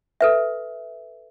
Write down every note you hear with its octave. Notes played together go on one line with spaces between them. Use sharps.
A4 B4 E5